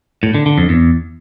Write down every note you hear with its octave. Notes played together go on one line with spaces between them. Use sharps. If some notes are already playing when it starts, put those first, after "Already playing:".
A2
D3
D3
F2
E2